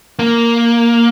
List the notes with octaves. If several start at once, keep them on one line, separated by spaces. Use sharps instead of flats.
A#3